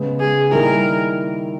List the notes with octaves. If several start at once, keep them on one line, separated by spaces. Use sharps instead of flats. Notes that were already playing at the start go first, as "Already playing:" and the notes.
Already playing: C#3 G#3 B3
G#4
D#3 G3 A#3 E4 A#4